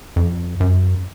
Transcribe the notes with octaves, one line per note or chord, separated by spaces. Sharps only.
F2
F#2